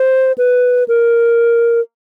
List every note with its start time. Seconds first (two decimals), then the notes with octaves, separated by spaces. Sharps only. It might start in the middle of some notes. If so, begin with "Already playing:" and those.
Already playing: C5
0.38 B4
0.88 A#4